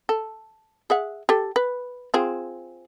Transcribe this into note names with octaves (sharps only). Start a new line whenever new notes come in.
A4
G#4 E5 F#5
G4 A4
B4
C4 F4 G#4